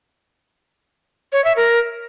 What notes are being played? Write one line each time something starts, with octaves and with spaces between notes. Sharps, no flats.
C#5
E5
A#4